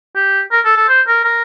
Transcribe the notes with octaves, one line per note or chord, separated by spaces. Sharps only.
G4
A#4
A4
A4
C5
A#4
A#4